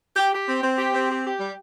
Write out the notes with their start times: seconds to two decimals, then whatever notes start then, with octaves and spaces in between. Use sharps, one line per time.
0.16 G4
0.32 G4
0.47 C4
0.63 C4
0.77 G4
0.94 C4
1.10 G4
1.25 G4
1.40 G3